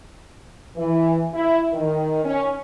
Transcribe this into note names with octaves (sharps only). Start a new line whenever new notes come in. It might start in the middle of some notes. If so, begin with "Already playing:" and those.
E3
E4
D#3
C#4